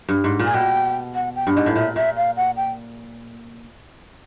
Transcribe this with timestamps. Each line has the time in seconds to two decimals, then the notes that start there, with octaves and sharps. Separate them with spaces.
0.08 G2
0.24 G#2
0.40 A#2
0.45 G#5
0.54 B2 G5
1.15 F#5
1.35 G5
1.47 G2
1.55 G#2 D#5
1.66 A2
1.75 A#2 E5
1.96 A#2 E5
2.17 F5
2.37 F#5
2.57 G5